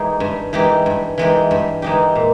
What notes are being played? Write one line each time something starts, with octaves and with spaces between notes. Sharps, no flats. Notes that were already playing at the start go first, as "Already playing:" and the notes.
Already playing: E3 G#3 D#4 G4
G2
E3 G#3 D#4 G4
G2
E3 G#3 D#4 G4
G2
E3 G#3 D#4 G4
A#2